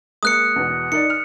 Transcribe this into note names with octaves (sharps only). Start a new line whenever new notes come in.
G#3 A#3 D#6 F#6 C#7
E2 B2
D#4 A#4 D5 C#7
F6